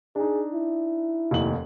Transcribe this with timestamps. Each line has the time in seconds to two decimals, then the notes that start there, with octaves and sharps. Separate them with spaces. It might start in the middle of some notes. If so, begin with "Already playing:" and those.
0.16 D4 D#4 G#4
0.53 E4
1.31 F1 D#2 F#7